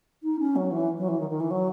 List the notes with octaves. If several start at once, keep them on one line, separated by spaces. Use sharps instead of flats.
D#4
C#4
F#3
E3
F#3
E3
D#3
D#3
E3
F#3